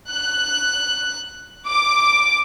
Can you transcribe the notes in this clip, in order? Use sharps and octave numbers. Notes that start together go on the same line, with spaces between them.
F#6
D6